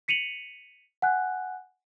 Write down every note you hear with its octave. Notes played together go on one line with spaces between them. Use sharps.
B6 C#7 D#7 F7 F#7
F#5 G#5 F#6